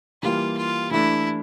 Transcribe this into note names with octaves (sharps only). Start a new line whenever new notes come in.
E3 G3 A#3 F4
F4
E3 A3 D4 E4